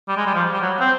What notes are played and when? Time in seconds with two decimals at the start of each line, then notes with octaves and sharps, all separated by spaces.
0.08 G3
0.17 G#3
0.26 G3
0.35 F3
0.53 G3
0.62 F#3
0.80 C4